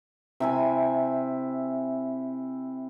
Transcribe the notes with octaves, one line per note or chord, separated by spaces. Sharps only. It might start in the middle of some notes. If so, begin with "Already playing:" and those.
C3 E4 G#5